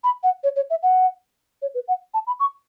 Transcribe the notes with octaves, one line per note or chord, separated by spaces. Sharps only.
B5
F#5
C#5
C#5
E5
F#5
C#5
B4
F#5
A5
B5
C#6